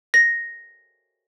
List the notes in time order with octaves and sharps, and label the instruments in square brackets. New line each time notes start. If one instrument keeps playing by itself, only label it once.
[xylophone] A#6